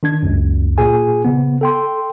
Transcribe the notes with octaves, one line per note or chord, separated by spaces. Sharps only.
D#3 D4 G#6
C#2 F#2
A#2 G#4 G#5
C#3 B3
A4 G5 C6